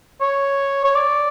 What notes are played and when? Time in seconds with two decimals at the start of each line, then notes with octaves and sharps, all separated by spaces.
0.21 C#5
0.84 C#5
0.95 D5